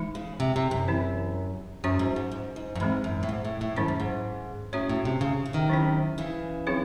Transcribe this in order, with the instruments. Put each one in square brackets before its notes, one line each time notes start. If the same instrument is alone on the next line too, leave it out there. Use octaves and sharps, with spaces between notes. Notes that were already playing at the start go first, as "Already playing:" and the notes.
Already playing: [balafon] E3 G#3 D#4
[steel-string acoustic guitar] C#3
C3
C3
F#2
[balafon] E3 C4 E4
[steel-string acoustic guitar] F#2 [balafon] F#3 C#4 F#4
[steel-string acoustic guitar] G#2
G#2
G#2
G#2
F#2
[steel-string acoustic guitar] G#2 [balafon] E3 G#3 C4
[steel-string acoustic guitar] F#2
A2
G#2
A2
A2
[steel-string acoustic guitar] G#2 [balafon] D#3 F#3 C#4 E4
[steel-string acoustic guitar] F#2
G#2
[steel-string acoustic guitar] A2 [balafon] C#4 F#4 C#5
[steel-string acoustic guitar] A2
C3
C#3
C#3
C3 D#3
[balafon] F#3 C#4 E4 C5
[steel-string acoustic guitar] C#3 E3
[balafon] F#3 C4 D#4 G#4 C#5